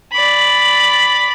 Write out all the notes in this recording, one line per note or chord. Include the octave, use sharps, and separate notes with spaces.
D5 B5